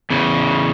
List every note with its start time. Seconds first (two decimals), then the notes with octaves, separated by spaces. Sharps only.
0.10 E2 C#3